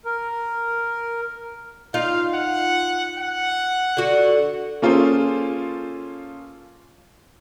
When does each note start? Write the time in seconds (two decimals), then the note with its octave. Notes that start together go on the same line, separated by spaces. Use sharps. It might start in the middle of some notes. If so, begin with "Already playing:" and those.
0.05 A#4
1.94 D#4 F4 F5
2.34 F#5
3.18 F#5
3.97 D3 F#4
4.82 A#3 C#4 F4 G#4 A4 C5